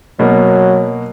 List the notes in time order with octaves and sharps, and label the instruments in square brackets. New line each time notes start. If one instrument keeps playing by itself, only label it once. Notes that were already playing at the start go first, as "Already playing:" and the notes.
[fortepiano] B2 A#3 [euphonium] F#3